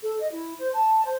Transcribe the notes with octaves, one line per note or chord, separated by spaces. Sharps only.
A4
D#5
E4
C5
A5
C5